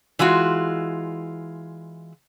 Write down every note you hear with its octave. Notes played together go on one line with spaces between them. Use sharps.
E3 G#3 F4 F#4